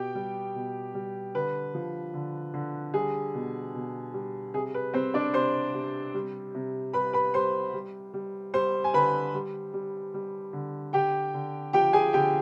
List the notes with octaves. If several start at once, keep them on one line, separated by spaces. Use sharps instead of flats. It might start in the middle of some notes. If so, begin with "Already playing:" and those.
Already playing: B2 G4 G5
G3
B2
G3
D3 B4
F3
D3
D3
G3 G#4
B2
B2
G3
C3 G#4
B4
G3 C4 C5
D4 D5
C3 C5 C6
C3
G3
C3
G3 B4 B5
B4 B5
G3 C5 C6
G3
G3
G3 C5 C6
G#5
D3 B4 B5
G3
G3
G3
D3
D3 G4 G5
D3
F3 G4 G5
G#4 G#5
D3 G4 G5